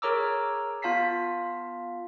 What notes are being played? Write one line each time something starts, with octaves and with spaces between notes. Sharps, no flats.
G#4 A#4 C#5 A#5 D6 E6
B3 F4 F5 A5 B6 C7